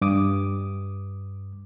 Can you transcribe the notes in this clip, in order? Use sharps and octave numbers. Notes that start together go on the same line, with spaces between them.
G2 D6 D#6